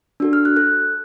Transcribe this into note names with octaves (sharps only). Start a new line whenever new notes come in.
D4 F#4 A4
F6
F#6
A4 F#6